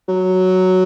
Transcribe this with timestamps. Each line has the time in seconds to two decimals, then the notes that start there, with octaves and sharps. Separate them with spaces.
0.08 F#3